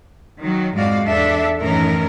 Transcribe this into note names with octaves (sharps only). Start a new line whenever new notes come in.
D#3 F#3
F2 G#2 G#3 F#4 D5 F5
E2 D4 A4 D5 E5
F#2 A2 D#3 E3 C#4 A#4